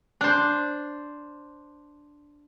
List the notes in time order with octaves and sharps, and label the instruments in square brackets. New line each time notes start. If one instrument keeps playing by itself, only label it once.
[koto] D4 C5